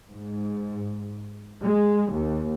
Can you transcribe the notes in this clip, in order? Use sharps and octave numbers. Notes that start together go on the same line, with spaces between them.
G#2
G#3
D#2